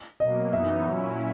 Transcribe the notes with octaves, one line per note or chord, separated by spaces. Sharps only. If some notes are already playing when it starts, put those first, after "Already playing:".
B2 F#3 A#3 D#5
F#2 E3 B3 D#4 E5
A#2 F#3 C#4 E4